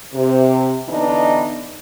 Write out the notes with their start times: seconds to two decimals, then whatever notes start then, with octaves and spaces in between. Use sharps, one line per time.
0.14 C3
0.88 D3 E3 B3 D4 D#4